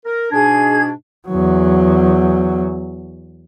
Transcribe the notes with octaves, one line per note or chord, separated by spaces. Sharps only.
A#4
G#2 B2 D4 G#4 G#6
E2 F#3